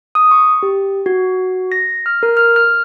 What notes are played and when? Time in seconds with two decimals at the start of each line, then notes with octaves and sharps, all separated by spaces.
0.15 D#6
0.31 C#6
0.63 G4
1.06 F#4
1.72 A#6
2.06 F6
2.23 A#4
2.37 F6
2.56 F6